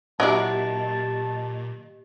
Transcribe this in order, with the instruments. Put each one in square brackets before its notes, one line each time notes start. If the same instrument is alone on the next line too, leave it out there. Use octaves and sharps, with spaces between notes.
[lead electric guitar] A#2 [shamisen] F#3 D4 E4 [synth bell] G4 D#5 [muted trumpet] A5